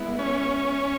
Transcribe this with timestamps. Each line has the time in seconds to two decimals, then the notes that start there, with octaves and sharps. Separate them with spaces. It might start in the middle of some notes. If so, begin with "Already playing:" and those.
Already playing: G#3 B3 E4
0.19 C#4